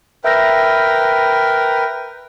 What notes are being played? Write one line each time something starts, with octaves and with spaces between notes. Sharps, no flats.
A#4 B4 E5 G5 E6 A#6